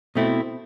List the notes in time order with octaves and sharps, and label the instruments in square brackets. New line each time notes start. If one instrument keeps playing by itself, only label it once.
[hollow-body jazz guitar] B2 A3 C4 E4